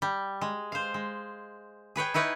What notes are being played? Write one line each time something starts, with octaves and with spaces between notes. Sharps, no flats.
G3
G#3
C5 F5
G#3
G#4 B4 C#5 G5
D#4 E4 B4 C#5 D#5